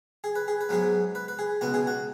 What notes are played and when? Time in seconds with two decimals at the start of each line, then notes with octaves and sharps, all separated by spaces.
0.24 G#4
0.36 B4
0.48 G#4
0.61 B4
0.69 G#2 F#3 B3 G#4
1.15 B4
1.28 B4
1.39 G#4
1.61 C#2 B2 B3 F#4
1.74 G#4
1.87 F#4